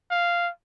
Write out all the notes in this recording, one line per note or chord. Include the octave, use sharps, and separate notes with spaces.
F5